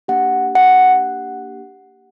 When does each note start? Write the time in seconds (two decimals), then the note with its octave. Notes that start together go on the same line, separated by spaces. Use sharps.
0.08 A#3 D4 G4 F#5
0.55 F#5